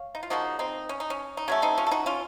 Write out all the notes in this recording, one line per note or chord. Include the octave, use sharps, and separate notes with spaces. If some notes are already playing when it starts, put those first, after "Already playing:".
Already playing: C#5 F5
D#4
F4
C#3 F3 A#3 D#4 F#4
C4 D#4
C#4
D#4
C#4
D#4
C#3 F#3 A3 C#4
C4 D#4
C#4 F4
A4
D#4 F#4
C#4 F4